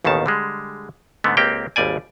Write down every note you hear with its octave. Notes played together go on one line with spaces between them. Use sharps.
A1 D#2 B2 D#3 A5
D3 G3 G#3
G#2 D3 A3 B3
C#2 A#3 C4 G4 G5
G#1 D#2 G3 D5 G#5